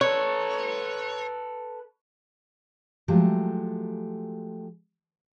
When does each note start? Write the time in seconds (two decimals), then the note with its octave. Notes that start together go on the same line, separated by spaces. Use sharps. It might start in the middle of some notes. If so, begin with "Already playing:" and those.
0.01 A4 B4 C#5
3.08 F3 F#3 G#3 A3 G4